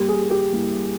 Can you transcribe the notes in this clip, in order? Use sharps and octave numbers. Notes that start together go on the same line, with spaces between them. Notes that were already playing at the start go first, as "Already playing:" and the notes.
Already playing: G2 G3 A#3 G4
G#4
G#4
G4
G2 G3 A#3 E4